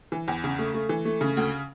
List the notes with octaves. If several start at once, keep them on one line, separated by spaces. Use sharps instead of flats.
E3
E2
C#3
A3
A3
E3
A3
C#3
D2